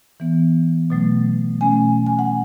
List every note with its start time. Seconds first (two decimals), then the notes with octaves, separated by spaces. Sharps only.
0.20 E3 B3
0.90 B2 F#3 A3
1.61 B2 A3 C#4 G#5
2.06 G#5
2.19 F#5